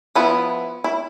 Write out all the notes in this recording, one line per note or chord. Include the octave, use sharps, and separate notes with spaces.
F3 B3 E4
E4